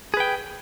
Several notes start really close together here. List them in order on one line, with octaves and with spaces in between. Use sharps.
G#4 B4 G5